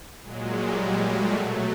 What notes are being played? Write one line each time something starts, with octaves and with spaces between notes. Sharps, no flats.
A#2 F#3 G#3
G3
G#3
A3
B2 F#3 A3